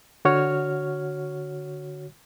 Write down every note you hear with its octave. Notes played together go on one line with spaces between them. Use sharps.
D3 F#4 C#5 F6